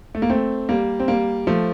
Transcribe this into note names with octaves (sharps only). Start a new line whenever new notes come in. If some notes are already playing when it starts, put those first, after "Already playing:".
A3
A#3
A3 C4
G3 A#3
C4
G3 A#3
F3 A3